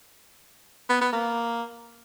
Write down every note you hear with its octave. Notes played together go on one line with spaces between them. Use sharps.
B3
B3
A#3